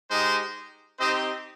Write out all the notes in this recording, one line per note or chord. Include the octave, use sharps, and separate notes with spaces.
G#3 D#4 G4 C5 D#5
C4 D#4 G4 C5 D#5